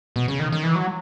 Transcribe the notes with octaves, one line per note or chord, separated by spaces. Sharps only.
B2
C#3
D#3
D#3
E3
F#3